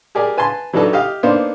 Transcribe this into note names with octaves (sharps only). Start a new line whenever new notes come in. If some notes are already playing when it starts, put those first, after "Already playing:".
G4 G#4 A#4 D5
B4 G#5 A5 C6
E3 F#3 D4 D#4 A4 B4
G4 D#5 F5
A#3 B3 D4 D#4 C5